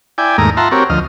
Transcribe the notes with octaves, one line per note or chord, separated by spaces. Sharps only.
E4 D5 G5 G#5
D#2 G#2 A3 A#3 A#5 D#6
F4 E5 F#5 A5 A#5 C6
C4 F#4 G4 A#4 C#5
D2 F3 D#5 F6